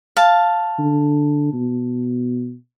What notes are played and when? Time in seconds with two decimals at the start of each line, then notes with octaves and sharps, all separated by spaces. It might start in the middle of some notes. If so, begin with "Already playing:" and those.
0.17 F5 A5
0.78 D3
1.53 B2